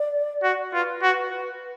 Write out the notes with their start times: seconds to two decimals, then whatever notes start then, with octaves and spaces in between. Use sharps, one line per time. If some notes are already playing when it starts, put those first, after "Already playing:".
Already playing: D5
0.43 F#4
0.73 F4 B4
1.02 F#4